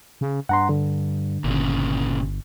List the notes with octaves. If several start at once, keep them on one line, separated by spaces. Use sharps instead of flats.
C#3
G2 F#5 A#5 C6
D3
G1 A#2 C#3